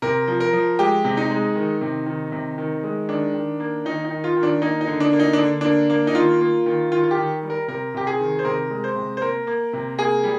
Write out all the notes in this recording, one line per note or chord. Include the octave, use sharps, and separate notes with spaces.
C3 A#4
F3
A#4
F3
G#3 G4
C3
D#4
G#3
D#3
C3
D#3
C3
D#3
G#3
D#3 D4
D#3
A#3
D#3 D#4
D#4
D#3
F4
D#3
D4
A#3 D#4
D#4
D3
D4
A#3
D#4
D4
D3
A#3 D4
A#3
D#4
D#3 F4
A#3
D#3
D#3 F4
F4
G4
D#3
G3
A#4
C3 A#4
C3 G4
G#4
D#3
C5
C3 A#4
G#3
C5
C3
C5
A#3 A#4
A#3
C3
A#3 G#4
G3